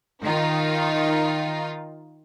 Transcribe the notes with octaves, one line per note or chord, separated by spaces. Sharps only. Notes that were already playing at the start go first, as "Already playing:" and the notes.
D#3 D#4 F4